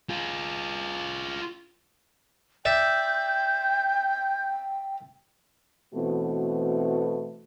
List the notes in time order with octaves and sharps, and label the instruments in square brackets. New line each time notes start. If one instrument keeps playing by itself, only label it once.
[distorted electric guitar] F4 G#4
[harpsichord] D5 E5 [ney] G5 [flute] G6
[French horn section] B2 E3 A3 B3 C4 F#4